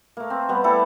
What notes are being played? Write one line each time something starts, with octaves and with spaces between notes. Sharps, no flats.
A3 A#3
C4
G3 B3
G3 A3 E4 A4